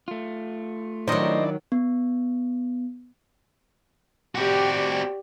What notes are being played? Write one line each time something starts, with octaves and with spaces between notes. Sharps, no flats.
A3 F4
D#3 F#3 D4 E4 C5 D5 D#5
B3
C4 F#4 G4 D5